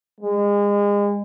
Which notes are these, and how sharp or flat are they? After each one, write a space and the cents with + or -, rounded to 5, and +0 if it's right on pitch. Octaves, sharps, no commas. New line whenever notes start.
G#3 -35